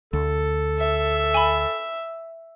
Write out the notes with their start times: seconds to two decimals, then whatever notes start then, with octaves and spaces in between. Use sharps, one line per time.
0.13 D2 A4
0.79 E5
1.34 G#5 B5